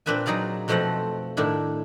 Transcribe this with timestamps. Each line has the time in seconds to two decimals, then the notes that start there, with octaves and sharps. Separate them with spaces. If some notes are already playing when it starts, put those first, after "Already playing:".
0.06 A#2 C4 D4 B4 E5 G#5
0.26 F#3 D#4 G#4 D5 F5
0.68 F2 B2 F3 A3 C4 F#5
1.37 A2 D#3 D4 E4